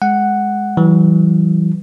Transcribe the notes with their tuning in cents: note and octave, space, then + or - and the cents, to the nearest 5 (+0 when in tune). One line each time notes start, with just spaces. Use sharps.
G#3 +0 F#5 +0
E3 +0 G3 -45